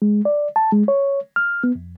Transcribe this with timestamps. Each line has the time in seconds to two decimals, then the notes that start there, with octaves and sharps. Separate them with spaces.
0.02 G#3
0.25 D5
0.56 A5
0.72 G#3
0.88 C#5
1.36 F6
1.64 B3
1.75 F2